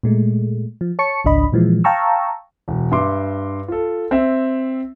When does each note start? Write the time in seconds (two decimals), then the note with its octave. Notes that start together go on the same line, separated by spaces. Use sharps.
0.03 A#2 G#3 A3
0.81 F3
0.99 C#5 A5 C#6 C#7
1.25 G#1 C#2 D4 D#5 B5
1.52 A#2 E3 F3 G#3
1.84 F5 G5 A5 A#5 C#6 E6
2.68 E1
2.92 G2 E5 C6 D6
3.68 F4 A4
4.11 C4 E5